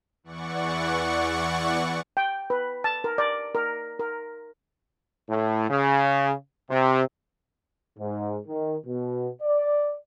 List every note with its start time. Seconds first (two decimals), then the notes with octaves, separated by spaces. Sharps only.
0.24 E2 E3 D5 F#5 C#6
2.17 G5
2.50 B4
2.84 A5
3.04 A#4
3.18 D5
3.55 A#4
3.99 A#4
5.29 A2
5.69 C#3
6.70 C3
7.98 G#2
8.47 D#3
8.86 B2
9.42 D5